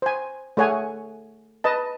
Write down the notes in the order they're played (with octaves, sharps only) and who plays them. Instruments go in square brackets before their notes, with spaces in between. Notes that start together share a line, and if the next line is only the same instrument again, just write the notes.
[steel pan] C5 G#5
A3 G#4 C#5 F#5 G#5
B4 D#5 A5